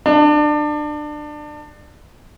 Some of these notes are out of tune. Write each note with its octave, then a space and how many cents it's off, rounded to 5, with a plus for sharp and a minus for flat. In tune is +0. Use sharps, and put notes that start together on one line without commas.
D4 +25